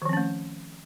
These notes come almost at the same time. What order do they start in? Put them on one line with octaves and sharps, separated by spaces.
D#3 F3 C4 C#4 A3